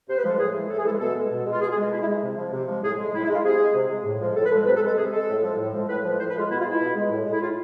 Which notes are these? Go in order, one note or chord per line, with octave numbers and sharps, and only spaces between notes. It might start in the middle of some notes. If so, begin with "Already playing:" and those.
C3 C5
B4
F3 G#3 A4
A2 G#4
E3 G#3
A2 A4
G#4
E3 G#3 A4
B2 A4
G#3
B2
G#3 F4
B2 G#4
G#4
G#3
F4
B2 E4
E4
G#3
C3
F3 G#3
C3
F3 G#3
A2 G#4
G#3
A2 E4
E4
G#3
F4
C3 G#4
G#3
C3
G#3
A2
F3 G#3
A2 A4
B4
F3 G#3
C3 B4
A4
G#3
A4
C3 G#4
G#3 A4
A2
F3 G#3
A2
F3 G#3
A2 B4
F3
G#3
A2 C5
B4
F3 G#3 F4
B2 E4
F4
G#3
E4
B2
G#3
A2
G#3
E4
A2 F4